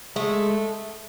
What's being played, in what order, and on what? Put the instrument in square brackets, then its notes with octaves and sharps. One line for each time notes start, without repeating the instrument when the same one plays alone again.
[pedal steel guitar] G#3 [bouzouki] A3